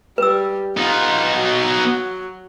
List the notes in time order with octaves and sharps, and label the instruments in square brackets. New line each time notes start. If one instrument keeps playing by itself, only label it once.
[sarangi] G3 [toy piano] B4 E6
[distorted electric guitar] B3 D#4 [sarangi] F4
[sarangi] F#3